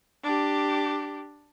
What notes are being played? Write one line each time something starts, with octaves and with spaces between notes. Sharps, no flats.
D4 G4